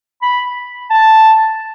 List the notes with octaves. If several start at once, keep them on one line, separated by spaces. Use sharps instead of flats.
B5
A5